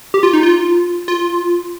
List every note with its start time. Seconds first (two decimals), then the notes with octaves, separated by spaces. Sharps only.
0.14 G4
0.23 F4
0.33 D#4
0.43 F4
1.08 F4